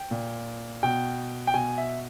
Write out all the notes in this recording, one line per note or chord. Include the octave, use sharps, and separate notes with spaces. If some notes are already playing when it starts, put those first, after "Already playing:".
Already playing: G5
A#2
B2 G5
G5
B2 G#5
E5